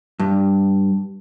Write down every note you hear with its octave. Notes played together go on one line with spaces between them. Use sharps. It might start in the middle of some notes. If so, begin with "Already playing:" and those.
G2